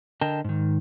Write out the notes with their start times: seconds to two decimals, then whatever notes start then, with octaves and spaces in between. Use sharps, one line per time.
0.21 D3 A#4 D#5 G5 A5
0.44 G#2 D#3